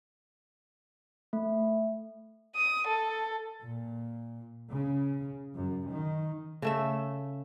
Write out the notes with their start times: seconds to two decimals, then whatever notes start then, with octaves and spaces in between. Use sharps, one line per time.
1.33 A3
2.56 D#6
2.88 A4
3.62 A#2
4.70 C#3
5.55 F#2
5.90 D#3
6.62 C#3 A3 E5